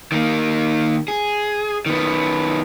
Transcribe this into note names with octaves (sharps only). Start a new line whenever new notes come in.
D#3 A#3
G#4
D#3 B3